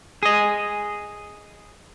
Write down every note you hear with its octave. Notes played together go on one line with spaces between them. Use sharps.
G#4 D#5